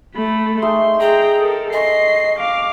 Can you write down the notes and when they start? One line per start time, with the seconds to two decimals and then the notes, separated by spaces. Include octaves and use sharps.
0.15 A3 B5
0.62 G#3 A3 D#4 C6
1.00 G#4 G5 A#5
1.40 A4 A#4
1.73 D#5 G#5 C6 C#6 C7
2.39 F5 D6